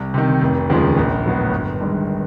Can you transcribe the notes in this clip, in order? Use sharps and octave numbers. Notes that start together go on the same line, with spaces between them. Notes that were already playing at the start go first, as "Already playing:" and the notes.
Already playing: C2
C3 D#3
F1
D#2 C#3 F3 G#3
A#1
A2 F#3 B3
G1
G2 D#3 G#3